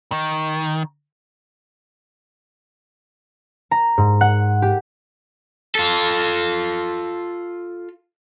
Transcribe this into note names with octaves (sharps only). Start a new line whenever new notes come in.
D#3
A#5
G#2
F#5
G4
F4 A4